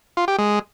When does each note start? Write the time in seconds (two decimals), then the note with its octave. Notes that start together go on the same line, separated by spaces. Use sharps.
0.17 F4
0.28 G4
0.38 G#3